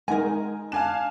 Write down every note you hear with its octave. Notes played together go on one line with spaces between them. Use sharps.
G#3 D#4 A#4 G#5
D4 F5 G#5 E7